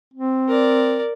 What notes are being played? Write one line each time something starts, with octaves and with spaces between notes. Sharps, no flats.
C4
A#4 D5